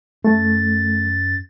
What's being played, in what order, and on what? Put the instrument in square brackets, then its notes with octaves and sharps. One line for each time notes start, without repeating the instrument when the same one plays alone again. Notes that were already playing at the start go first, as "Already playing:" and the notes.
[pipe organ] F#2 A6 [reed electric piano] A3